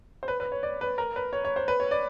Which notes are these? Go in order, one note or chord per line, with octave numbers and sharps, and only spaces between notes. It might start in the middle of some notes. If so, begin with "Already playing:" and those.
C5
B4
B4
C#5
D5
B4
A#4
B4
C#5
C#5
C5
B4
C#5
D5